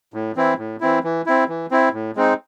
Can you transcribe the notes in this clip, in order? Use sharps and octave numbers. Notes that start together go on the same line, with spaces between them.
A2
E3 C4 E4
A2
E3 C4 E4
E3
C4 E4
E3
C4 E4
A2
G#3 C4 D#4